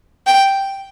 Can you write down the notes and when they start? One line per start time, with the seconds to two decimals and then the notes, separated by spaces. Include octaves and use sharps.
0.27 G5